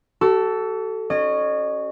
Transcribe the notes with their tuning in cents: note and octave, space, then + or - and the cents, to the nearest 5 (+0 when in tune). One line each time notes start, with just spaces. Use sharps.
F#4 +45 A4 +0
C#4 +0 D#5 -35